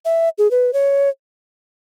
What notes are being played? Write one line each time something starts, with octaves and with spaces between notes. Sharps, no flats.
E5
G#4
B4
C#5